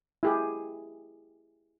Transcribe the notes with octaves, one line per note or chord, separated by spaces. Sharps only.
E4 G4 G#4